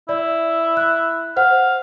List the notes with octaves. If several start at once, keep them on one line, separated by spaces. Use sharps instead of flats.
E4 D5
F#6
C5 F5 F#5